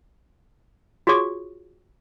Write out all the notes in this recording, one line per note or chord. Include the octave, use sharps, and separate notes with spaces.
F4 F#4 G#4 C#5 C#6 D6